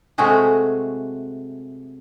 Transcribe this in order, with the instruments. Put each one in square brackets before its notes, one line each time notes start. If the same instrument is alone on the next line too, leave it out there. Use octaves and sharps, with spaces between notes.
[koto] C3 G#3 A3 F#4 G#4